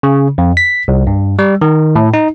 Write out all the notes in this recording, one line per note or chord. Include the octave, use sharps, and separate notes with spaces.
C#3
F2
B6
C2
G2
G3
D#3
A2
D#4